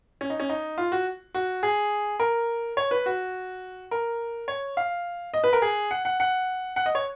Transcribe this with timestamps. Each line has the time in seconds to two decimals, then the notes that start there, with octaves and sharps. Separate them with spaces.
0.21 C#4
0.30 D#4
0.40 C#4
0.49 D#4
0.78 F4
0.92 F#4
1.35 F#4
1.63 G#4
2.20 A#4
2.77 C#5
2.91 B4
3.06 F#4
3.91 A#4
4.48 C#5
4.77 F5
5.34 D#5
5.44 B4
5.53 A#4
5.62 G#4
5.91 F#5
6.05 F#5
6.20 F#5
6.76 F#5
6.86 D#5
6.95 C#5